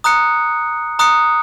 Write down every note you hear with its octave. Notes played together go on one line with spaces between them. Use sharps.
A#5 D#6 F#6 C#7
A#5 D#6 F#6 C#7